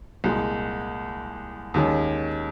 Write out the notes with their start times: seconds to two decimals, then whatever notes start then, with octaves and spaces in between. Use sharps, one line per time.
0.24 C2 A#2 G#3
1.74 D#2 D#3 G#3 C#4